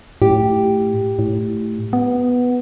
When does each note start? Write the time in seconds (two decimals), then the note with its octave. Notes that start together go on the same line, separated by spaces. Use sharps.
0.22 A2 G4
1.19 A2
1.93 B3